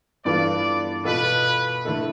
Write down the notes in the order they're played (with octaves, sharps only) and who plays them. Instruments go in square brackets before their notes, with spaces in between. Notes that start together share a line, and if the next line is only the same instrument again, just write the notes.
[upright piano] G2 E3 B3 F4 A4 [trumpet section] D5
[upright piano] B2 B3 F4 A4 [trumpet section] B4
[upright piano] D3 A3 E4 A4